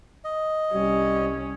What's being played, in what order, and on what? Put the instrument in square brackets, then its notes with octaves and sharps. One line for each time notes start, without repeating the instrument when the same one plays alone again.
[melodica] D#5
[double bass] C2 [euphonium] G3 [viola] C#4